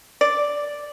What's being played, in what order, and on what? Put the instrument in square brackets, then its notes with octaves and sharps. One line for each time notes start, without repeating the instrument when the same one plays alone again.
[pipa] D5